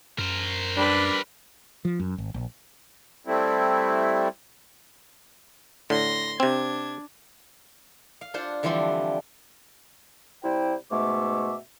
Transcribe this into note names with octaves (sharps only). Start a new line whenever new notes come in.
F#2 A#4 C5
G3 D4 B4
F3
F#2
G#1
A#1
G3 A3 C4 E4
A2 D3 C6 A#6
C3 C4 D4 G#6
F5
D4 F4 C5 F#5
D3 E3 F3 G3 C4 D4
C3 G3 E4 C5 G5
G#2 B2 A3 E5 D6